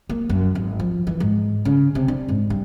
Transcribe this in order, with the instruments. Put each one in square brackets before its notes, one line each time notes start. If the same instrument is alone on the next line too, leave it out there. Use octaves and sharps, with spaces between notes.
[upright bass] A#3
F#2
G#1
F3
E3
G#2
C#3
C3
D4
G#2
G2